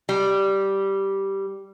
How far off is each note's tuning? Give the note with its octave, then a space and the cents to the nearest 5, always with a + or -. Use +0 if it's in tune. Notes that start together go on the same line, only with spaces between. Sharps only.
G3 -5